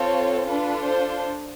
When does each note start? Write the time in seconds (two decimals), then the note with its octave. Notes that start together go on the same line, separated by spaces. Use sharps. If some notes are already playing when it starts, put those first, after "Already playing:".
Already playing: C4 F4 A4 C#5
0.47 D4 F4 A4 B4
0.87 C5